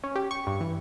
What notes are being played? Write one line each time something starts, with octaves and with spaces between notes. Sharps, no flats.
C#4
G4
C#6
G2
E3